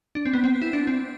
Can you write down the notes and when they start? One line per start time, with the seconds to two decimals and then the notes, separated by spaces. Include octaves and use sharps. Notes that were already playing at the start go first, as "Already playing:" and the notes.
0.15 D4
0.25 C4
0.33 B3
0.44 C4
0.62 E4
0.73 D4
0.87 C4